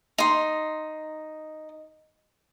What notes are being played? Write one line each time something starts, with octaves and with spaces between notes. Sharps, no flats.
D#4 C6